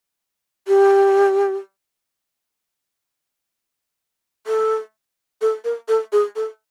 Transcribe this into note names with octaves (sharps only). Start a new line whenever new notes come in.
G4
A4
A4
A#4
A4
G#4
A4